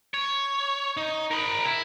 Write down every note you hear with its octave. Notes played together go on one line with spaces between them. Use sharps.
C#5
D#4
A#4 B5
E4